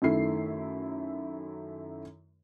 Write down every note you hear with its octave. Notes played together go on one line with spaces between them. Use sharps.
F#2 D#3 A3 E4 C7